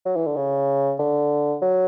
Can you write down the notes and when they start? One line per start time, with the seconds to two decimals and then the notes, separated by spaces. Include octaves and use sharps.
0.05 F#3
0.16 E3
0.26 D3
0.37 C#3
0.99 D3
1.62 F#3